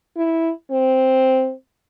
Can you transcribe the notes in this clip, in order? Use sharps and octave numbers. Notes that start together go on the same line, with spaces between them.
E4
C4